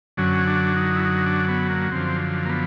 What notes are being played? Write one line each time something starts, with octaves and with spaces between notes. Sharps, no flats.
F#2 D3 F#3 C#4
D4
D#4
E4
D#4
D4
B3
A#3
F#2 D3 F3 C4
A#3
B3